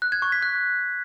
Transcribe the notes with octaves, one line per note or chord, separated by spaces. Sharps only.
F#6
G#6
C#6
B6
F#6